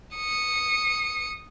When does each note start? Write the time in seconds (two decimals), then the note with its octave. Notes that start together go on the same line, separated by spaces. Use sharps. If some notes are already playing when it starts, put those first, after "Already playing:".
0.16 D#6 C#7